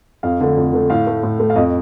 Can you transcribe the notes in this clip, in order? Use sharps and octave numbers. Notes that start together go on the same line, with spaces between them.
F2 F5
D3 A3
F2
D3 A3
A2 F5
A3
A2
A3
F5
F2 D#5